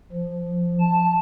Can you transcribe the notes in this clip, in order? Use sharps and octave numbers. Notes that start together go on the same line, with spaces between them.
F3
A5